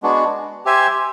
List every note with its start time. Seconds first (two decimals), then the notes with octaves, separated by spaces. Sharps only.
0.03 G#3 B3 D4 F#4
0.65 G4 C5 E5 G#5